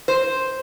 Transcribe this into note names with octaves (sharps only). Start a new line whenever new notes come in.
C5